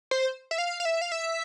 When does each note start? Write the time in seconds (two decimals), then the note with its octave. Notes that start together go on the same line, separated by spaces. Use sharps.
0.11 C5
0.51 E5
0.58 F5
0.80 F5
0.85 E5
1.01 F5
1.12 E5